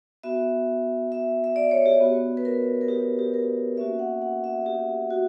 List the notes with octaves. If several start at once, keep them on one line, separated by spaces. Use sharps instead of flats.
B3 F#4 E5
E5
E5
D5
C#5
G4
B3 F#4
B4
A#4
A#4
G4
G4
A#4
A#3 C#4 F#4 E5
F#5
F#5
E5
G4
F#4